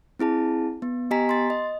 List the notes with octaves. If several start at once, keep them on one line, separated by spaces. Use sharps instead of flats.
C4 E4 G#4 A5
B3
B3 G4 D#5 G#5 A#5 B6
C6 A6
D#5